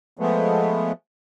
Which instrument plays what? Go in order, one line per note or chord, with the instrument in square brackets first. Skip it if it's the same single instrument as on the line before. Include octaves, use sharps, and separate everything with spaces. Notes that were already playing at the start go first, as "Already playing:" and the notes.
[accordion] F3 G#3 A3 B3